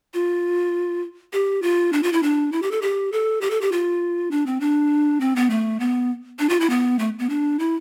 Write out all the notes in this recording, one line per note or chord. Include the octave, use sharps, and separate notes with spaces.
F4
G4
F4
D4
F4
E4
D4
E4
G4
A4
G4
A4
G4
A4
G4
F4
D4
C4
D4
C4
B3
A3
B3
D4
F4
E4
B3
A3
B3
D4
E4